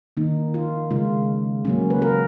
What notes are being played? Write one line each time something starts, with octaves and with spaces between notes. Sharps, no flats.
D#3 A#3 D#4
F4
C#3 G#3 F4
C#3 F#3 A#3 C#4
B4
A#4